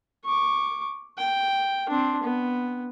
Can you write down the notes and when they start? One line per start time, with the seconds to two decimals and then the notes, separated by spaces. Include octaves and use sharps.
0.24 C#6 D6
1.18 G5
1.89 C4 D4
2.23 B3